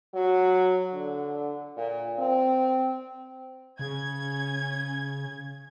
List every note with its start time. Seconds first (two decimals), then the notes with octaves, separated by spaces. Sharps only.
0.14 F#3
0.93 D3
1.77 A#2
2.19 C4
3.79 C#3 C#4 G#6